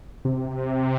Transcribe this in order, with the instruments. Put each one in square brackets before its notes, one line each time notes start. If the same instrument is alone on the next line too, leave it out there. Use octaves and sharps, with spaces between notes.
[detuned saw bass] C3